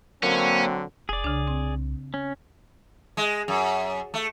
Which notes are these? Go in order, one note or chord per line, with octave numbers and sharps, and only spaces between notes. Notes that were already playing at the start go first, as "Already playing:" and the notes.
D3 F#3 A#3 C4 C#4
F1 G#4 D5
C2 C#3 D4
C4
C#4
G#3
F#2
A3